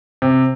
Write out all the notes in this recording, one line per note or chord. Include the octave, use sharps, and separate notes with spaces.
C3